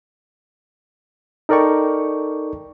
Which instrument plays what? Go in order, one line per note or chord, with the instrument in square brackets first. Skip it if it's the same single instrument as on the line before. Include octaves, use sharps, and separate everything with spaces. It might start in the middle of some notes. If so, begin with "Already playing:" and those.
[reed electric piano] D#4 A4 A#4 D5 G5 C#6